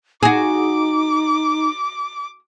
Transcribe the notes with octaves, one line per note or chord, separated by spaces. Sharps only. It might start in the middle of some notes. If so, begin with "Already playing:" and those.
D#4 F#4 G#4 D6